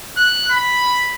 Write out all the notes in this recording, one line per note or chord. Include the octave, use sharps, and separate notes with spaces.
F#6
B5